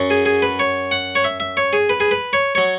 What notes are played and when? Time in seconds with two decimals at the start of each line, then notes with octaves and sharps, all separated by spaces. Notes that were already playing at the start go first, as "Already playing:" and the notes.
Already playing: F#2 F#3
0.10 G#4
0.26 G#4
0.42 B4
0.59 C#5
0.91 F#5
1.15 C#5
1.24 E5
1.40 E5
1.57 C#5
1.73 G#4
1.89 B4
2.00 G#4
2.11 B4
2.33 C#5
2.55 F#3 C#5